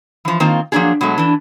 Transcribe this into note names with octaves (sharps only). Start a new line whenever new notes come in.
E3 F3
D#3 A#3 C4 F4
F3 F#3 A#3 D4 G4 G#4
B2 F#3 G#3 A3
E3 D4